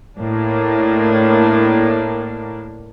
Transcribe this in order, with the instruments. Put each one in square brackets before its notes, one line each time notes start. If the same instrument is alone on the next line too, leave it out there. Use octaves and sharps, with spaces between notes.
[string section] A2 A#3 D4